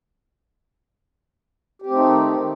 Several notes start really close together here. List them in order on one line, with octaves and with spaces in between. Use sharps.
G4 C4 A3 D#4 D#3